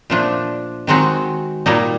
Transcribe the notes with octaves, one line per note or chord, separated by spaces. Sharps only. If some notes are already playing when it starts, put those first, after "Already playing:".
A#2 F3 A3 D4
D#3 G#3 C4 D#4 F#4
A#2 G3 A#3 D#4